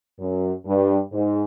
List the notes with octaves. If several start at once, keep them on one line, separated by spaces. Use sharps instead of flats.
F#2
G2
G#2